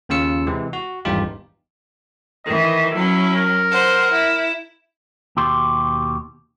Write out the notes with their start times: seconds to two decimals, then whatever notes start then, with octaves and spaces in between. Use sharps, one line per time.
0.09 D#2 C#3 C#4 F4 E6 C#7
0.47 C3 E3 G#3
0.73 F#4
1.05 G#1 E2 G2 D#4 F4 G4
2.45 D#3 E3 D#5
2.92 F#3 C#4 E4
3.35 A#4
3.70 C5 F#5
4.11 E4
5.37 D#2 B2 G4 C6